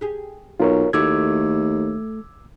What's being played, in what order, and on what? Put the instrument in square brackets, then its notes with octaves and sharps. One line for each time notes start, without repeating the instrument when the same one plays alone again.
[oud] G4 G#4
[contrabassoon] B1 [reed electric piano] F4 A#4 C#5
[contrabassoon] D#2 [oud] A3 E4 F#4 [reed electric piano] D6 E6 G#6